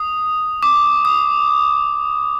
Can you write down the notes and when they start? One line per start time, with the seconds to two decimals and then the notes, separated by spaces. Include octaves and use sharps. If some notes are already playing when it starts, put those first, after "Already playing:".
Already playing: D#6
0.63 D6
1.05 D#6